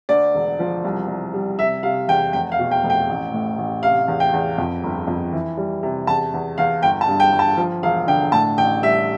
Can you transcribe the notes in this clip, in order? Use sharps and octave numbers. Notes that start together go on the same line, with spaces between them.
D2 D5
E1
F3
C2
C2
G3
C3 E5
C3 F5
E2 G5
F1 G5
F5
B2
G5
F1
G5
A1
A2
A1
C3 F5
E2
G5
E2
F2
G1
F2
E3
G3
C3
E2 A5
E2
E2 F5
G1 G5
A5
G2
G5
G1
A5
F3
E1 F5
D3 G5
A2 A5
A1 G5
G3 E5